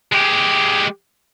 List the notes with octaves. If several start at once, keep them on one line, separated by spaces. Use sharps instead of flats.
G#3 G4